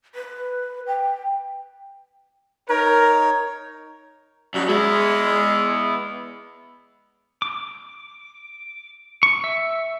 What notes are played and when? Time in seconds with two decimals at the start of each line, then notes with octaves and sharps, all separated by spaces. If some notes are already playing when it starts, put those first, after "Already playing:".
0.15 B4
0.87 G5
2.69 D#4 A#4 C#5
4.54 F#2 F#3 G3 D#4
4.68 G#3 B3 E4
7.42 D6
9.23 C#6
9.44 E5